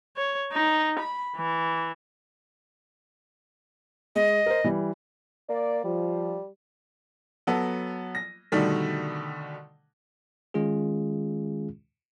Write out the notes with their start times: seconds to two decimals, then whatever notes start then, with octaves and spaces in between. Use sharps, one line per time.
0.16 C#5
0.52 D#4
0.99 B5
1.36 E3
4.16 G#3 D#5
4.46 A#4 C5
4.64 E3 G3
5.50 A#3 D5
5.84 F3 G3
7.47 F#3 B3 A4
8.15 A#6
8.52 B2 D3 D#3 G3 A3
10.54 D#3 G#3 C#4 F4 G#4